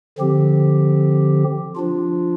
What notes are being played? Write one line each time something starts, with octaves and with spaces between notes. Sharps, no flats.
D3 F3 C4 G4
F3 D4 F4